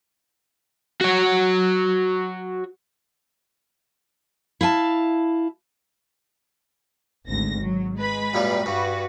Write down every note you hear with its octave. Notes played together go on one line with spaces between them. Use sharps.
F#4 C#5
E4 F5 G#5 A5
G#1 D2 A#6
F#3
G#3 B4 B5
F#2 A#2 G3
G2 F#4 B4